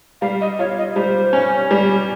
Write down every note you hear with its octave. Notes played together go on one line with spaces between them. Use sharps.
G3 F5
D#5
F4 C#5
D#5
G3 C5
C#4
G3